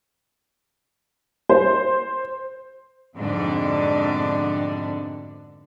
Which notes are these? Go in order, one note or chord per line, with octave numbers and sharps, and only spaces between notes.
C5
F2 G#2 B2 D3 D4